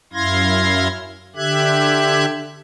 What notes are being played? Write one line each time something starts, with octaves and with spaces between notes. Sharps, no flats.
F#2 E4 F5 C6 G#6 A#6
D3 G4 E5 F#6 G#6